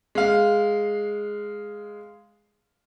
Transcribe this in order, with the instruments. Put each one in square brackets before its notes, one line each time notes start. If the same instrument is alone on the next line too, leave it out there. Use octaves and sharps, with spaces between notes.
[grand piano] G#3 F5